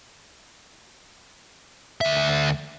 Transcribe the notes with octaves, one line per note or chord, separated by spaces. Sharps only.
D2 E5